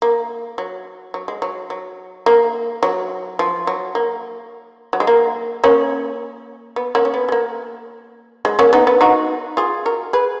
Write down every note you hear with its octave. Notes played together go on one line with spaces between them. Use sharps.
A#3
F#3
F#3
G#3
F#3
F#3
A#3
F#3
F3
F#3
A#3
F#3
G#3
A#3
A#3 C#4
B3
A#3 C#4
C#4
B3
G#3
A#3
G#3
A#3 C#4
B3 D#4
B3
D#4 F#4
F4 G#4
F#4 A#4
G#4 B4